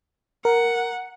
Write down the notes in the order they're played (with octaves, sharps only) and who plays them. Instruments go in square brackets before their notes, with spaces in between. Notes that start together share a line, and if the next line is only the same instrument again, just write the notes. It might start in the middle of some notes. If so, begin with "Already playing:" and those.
[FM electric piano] A#4 [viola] F#5